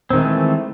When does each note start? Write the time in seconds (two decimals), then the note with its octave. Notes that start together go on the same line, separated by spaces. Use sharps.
0.10 C4
0.13 D#3
0.16 G#3
0.18 A3
0.21 E3